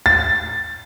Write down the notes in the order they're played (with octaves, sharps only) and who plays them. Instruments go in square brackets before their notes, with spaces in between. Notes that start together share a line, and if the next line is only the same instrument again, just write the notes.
[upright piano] A6